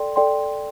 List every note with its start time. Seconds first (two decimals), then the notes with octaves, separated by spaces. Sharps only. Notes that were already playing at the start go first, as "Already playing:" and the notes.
Already playing: A4 D5 G5 C6
0.16 A4 D5 G5 C6